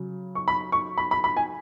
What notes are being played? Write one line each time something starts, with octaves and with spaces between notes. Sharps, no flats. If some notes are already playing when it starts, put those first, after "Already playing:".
Already playing: C#3 F#3
C#6
B5
C#6
B5
B5
B5
G#5